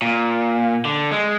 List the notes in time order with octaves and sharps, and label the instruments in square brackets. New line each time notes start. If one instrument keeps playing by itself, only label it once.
[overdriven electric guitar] A#2
D3
G#3